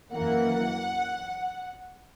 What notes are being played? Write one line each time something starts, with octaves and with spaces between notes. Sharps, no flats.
F#2 E3 A#3 F#5